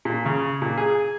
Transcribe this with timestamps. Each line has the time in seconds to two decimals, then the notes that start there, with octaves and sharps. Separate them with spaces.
0.05 A#2
0.25 C#3
0.62 A#2
0.78 G#4